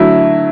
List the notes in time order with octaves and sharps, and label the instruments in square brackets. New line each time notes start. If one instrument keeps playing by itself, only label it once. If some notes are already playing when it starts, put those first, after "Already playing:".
Already playing: [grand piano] D3 F#3 A3 E4